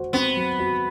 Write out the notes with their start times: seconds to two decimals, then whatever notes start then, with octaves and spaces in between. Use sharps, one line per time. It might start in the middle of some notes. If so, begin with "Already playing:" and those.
Already playing: F#4 C5
0.13 B3 C4
0.37 F#3
0.59 F#4